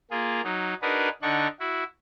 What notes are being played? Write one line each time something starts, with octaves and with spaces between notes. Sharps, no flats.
A#3 F4 G#4
F#3 D#4
D4 D#4 F#4 G#4 A#4 B4
D3 D4 D#4 F#5 C#6
E4 F#4